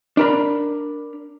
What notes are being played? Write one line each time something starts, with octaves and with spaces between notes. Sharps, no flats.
D4 A#4 B5